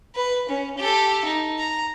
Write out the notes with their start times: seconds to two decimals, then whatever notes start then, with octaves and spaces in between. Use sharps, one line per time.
0.15 B4
0.49 C#4
0.78 G4 A4
1.25 D#4
1.58 A#5